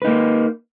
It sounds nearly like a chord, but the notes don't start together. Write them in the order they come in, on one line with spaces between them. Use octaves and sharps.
B4 D#4 A#3